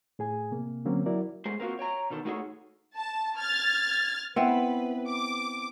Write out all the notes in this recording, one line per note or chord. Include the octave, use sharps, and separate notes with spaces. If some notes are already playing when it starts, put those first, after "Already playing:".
A2 G#4 G#5
C3 A#3
D3 F#3 A#3 C4 C#4
F#3 E4 F#4 A#4 D5
G#3 A3 G#4 C5
A#3 C4 F4 F#4
C#5 G5 A#5
B2 D#3 A4
A3 D#4 F#4 G#4 A4 C#5
A5
F6 G#6 A6
B3 C4 E4 B4
D6